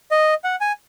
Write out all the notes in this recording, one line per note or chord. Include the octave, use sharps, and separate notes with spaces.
D#5
F#5
G#5